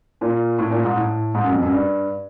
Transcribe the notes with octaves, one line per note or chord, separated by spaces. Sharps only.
A#2
A2
A#2
G#2
A2
G#2
F#2
F2
F#2
G2